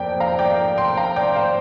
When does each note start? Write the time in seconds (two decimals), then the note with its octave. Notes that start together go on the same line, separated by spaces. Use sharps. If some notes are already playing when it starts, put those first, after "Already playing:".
Already playing: F2 F3 A#3 A#4 D5 G5
0.20 F5 A#5
0.39 D5 G5
0.78 G5 C6
0.97 F5 A#5
1.16 D5 G5
1.35 C5 F5